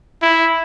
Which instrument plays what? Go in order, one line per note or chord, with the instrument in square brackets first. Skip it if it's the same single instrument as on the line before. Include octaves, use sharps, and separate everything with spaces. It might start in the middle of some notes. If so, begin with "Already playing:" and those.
[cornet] E4